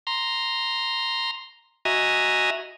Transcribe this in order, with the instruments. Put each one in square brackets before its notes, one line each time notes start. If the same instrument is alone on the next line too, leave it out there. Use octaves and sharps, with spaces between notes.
[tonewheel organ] A#5 C6
F#4 D#5 E5 G#5 A#5